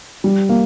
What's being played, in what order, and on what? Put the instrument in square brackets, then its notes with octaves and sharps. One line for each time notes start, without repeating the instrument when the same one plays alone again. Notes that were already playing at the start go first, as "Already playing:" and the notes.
[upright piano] G3
A#3